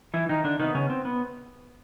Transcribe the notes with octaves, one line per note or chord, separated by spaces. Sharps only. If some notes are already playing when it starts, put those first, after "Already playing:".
E3 E4
D#3 D#4
D3 D4
C3 D#3 B3 D#4
C#3 C#4
C4
B3